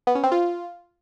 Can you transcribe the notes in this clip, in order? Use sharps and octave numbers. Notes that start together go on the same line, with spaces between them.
B3
C#4
C4
F4